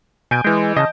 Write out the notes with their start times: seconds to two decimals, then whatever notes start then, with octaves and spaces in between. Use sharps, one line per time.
0.31 B2 G#5 G6 D7
0.44 E3 G#3 G6
0.76 C#3 D#5 A5